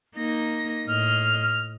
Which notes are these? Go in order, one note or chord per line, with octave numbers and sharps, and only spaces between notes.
A#3 D#4 A#6
A2 D#5 F6